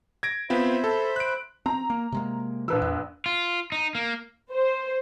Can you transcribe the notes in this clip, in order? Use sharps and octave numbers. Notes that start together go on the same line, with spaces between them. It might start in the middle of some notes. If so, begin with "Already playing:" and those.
G#6 A#6 D7
B3 C4 F4 C5 E5 B5
A4
F#6 D7
C4 A#5
A#3
C3 G#3 A#3
A#1 E3 B4 E6
E2
F4
D#4
A#3
C5